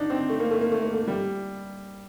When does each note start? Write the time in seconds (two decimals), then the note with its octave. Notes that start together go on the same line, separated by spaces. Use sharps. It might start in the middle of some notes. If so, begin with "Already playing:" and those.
Already playing: D4 D#4
0.10 C4
0.30 A3
0.40 A#3
0.51 A3
0.61 A#3
0.72 A3
0.82 A#3
0.93 A3
1.08 G3